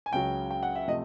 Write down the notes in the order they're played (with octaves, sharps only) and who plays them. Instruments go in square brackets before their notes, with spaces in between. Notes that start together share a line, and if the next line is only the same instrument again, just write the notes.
[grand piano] G#5
C#2 C#3 F#3 G5
G5
F#5
E5
C3 F3 A3 D#5